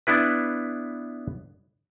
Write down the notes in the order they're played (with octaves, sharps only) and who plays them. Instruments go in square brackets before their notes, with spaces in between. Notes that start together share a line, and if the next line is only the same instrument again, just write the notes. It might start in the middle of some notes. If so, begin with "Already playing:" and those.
[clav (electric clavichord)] B3 D4 E4 B4